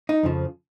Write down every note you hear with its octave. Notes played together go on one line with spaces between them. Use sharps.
D#4
F2 C#3 F3